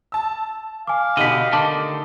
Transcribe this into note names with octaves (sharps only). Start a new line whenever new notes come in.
A5 E6
F5 G#5 D6
B2 D3 D#4 G4 D#5 B6 D#7
D3 D#3 A3 A5 D6